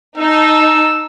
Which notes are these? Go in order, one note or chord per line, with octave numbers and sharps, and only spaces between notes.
D#4 A5 E6